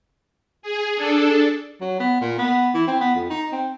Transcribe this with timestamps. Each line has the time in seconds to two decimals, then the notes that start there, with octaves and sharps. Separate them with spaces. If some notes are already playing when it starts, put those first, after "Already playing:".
0.62 G#4
0.96 D4 A4
1.81 F#3
2.00 B3
2.21 A#2
2.38 B3
2.74 E3
2.87 C4
3.00 B3
3.15 F2
3.30 D#4
3.52 C4